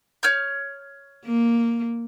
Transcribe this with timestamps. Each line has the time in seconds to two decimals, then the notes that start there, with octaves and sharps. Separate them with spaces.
0.23 C#5 F6 G6
1.25 A#3